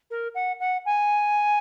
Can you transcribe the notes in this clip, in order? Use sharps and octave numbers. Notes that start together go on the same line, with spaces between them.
A#4
F#5
F#5
G#5